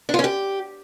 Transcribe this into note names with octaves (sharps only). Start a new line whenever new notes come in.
D4
F4
C#4
G4